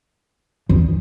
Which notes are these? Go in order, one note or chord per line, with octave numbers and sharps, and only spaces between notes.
E2